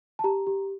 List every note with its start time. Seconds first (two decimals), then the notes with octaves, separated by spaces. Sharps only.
0.19 A5
0.24 G4 A#5
0.47 G4